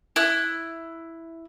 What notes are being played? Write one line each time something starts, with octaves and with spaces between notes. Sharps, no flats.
E4 F#6